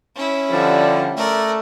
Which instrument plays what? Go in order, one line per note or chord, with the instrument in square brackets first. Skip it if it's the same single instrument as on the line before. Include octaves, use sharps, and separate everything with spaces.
[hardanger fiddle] C#4 E4
[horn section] D3 F3 G3
[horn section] A3 [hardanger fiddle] A#4 D5